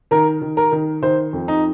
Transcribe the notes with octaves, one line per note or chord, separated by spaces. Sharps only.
D#3 A#4
D#3
A#4
D#3
D#3 C5
F2
D#4